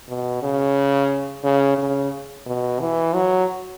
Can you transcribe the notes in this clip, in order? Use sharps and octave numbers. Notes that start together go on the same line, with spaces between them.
B2
C#3
C#3
C#3
B2
E3
F#3